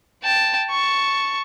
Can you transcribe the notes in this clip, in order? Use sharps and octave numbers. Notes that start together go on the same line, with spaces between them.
G5 A5
A5 C#6